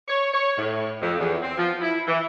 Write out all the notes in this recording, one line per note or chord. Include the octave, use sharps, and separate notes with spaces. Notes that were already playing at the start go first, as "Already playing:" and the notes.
C#5
C#5
A2
F2
E2
C4
F3
E4
E3